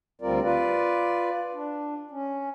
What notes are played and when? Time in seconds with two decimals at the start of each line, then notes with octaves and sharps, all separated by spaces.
0.22 D2 G3 C4 F4 A#4 D5
0.43 F4 B4 D5
1.54 D4
2.11 C#4